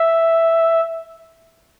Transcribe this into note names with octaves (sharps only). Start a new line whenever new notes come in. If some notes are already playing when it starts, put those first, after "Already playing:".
Already playing: E5